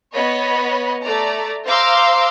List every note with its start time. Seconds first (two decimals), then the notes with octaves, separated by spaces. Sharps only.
0.14 B3 C#5 D#5 B5
1.02 A3 D5 A#5
1.66 C5 F5 A#5 C6 D6 E6